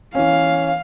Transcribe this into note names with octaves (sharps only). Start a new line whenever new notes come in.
E3 C#4 F5